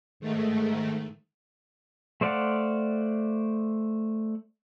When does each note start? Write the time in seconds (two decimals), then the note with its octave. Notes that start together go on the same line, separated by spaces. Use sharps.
0.20 G#2 D#3 A3
2.21 A3 C5 D5 F5 F#5